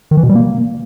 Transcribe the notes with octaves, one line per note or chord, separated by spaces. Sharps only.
D#3
E3
B2
G3
A#3